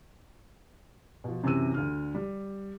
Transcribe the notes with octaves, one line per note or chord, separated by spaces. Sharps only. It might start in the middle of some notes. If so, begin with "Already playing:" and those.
B2 F3
F#2 C3 E3 C4 E6 D#7
D2 D3 F6
G3